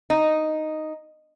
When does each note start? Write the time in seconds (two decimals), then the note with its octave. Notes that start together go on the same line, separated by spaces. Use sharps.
0.10 D#4